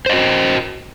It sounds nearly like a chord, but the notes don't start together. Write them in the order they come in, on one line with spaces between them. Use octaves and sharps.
C5 D#5 F#4